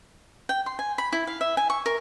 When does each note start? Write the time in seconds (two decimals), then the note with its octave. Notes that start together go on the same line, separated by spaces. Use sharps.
0.49 G5
0.66 C6
0.79 G#5
0.98 B5
1.12 E4
1.27 F5
1.41 E5
1.57 G#5
1.70 C#6
1.86 A#4